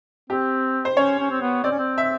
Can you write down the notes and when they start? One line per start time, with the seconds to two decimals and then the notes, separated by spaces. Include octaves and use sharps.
0.30 C4 G4
0.85 C5
0.97 C#4 C#5
1.19 C#4
1.31 C4
1.41 B3
1.64 C4 D5
1.71 C#4
1.79 C4
1.98 E5